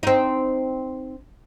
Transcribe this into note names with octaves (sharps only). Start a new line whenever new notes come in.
C4 D#4